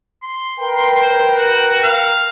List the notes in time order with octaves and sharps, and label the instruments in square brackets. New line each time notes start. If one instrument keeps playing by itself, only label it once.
[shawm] C6
[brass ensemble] A#4 B4 G5
[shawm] C5
F#4
F5